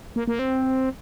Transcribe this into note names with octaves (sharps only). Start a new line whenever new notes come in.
A#3
A#3
C4